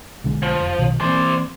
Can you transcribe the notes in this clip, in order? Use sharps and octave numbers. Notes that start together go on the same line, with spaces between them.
B1 D3 G#3
F3
F1
B1 B2 D#3
E3 A#3 C4 C5 D5